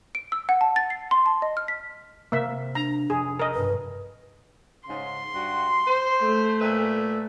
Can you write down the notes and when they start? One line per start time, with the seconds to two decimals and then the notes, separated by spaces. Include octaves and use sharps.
0.15 D7
0.32 E6
0.49 F#5
0.61 A5
0.76 A6
0.90 C7
1.11 C6
1.26 A5
1.42 D#5
1.57 F6
1.68 B6
2.32 C3 A#3 E5
2.75 D4 A#5
3.10 F1 G#4
3.39 A4 A#4 D#5 G5
3.54 B1 G2 B4
4.88 G#2 C#3 C6
5.34 G2 F#4
5.87 C5
6.24 A3
6.61 A#2 B4 E5